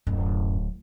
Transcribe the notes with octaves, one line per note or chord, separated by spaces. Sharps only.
D1 F#2